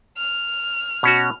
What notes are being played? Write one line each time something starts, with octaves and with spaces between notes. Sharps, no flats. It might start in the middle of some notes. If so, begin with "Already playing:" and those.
F6
B2 C#4 F#4